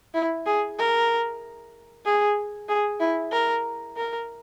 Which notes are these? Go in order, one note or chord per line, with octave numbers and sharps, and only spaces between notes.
E4
G#4
A#4
G#4
G#4
E4
A#4
A#4